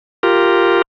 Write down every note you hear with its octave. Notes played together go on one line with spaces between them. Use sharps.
F4 G4 A#4